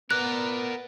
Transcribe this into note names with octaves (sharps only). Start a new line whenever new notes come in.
B3 A#4 D5 F#6